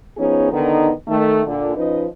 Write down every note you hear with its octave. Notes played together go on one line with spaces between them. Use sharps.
F3 B3 C#4 D#4 G#4 C#5
E2 D3 D#3 B3 D#4
D#3 A3
A#2 D3
F3 C#4 D#4 B4 D#5